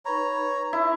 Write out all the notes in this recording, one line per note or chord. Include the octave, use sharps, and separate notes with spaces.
D#4 B4 C#5 A#5 B5
E4 E5